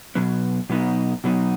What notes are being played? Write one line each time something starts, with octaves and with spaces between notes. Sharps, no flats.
B2 F#3 B3
B2 F#3 B3 D#4
B2 F#3 B3 D#4